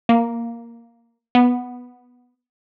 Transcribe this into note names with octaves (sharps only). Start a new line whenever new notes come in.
A#3
B3